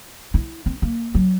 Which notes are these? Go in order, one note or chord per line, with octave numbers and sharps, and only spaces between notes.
E4
C4
A#3
F#3